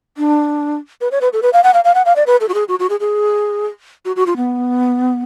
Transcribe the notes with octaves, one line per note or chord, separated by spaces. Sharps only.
D4
B4
C#5
B4
A4
B4
F5
F#5
F5
F5
F#5
F5
D5
B4
A4
F#4
G#4
F#4
F#4
G#4
G#4
F#4
F#4
F4
B3